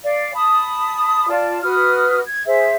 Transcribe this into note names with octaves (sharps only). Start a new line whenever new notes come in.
D5 F5
A5 B5 D#6
F4 D5 A5
F#4 B4 D#6 F6
G#6
G#4 C5 E5